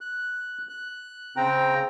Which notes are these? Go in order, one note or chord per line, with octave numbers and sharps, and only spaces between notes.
F#6
F#6
C#3 C4 G5 A#5